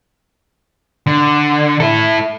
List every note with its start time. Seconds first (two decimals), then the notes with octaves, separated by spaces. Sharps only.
1.06 D3
1.80 E4 A4